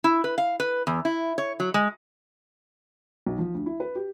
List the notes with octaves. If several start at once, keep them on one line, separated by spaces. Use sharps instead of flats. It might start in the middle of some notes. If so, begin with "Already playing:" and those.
E4
B4
F5
B4
E2
E4
C#5
F#3
G#3
B1
F3
D2
E4
B4
G4